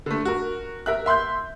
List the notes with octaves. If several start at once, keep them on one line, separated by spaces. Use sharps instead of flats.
D3 A3
F#4 A#4
A#4 E5 F#6
E5 C6 F#6 G6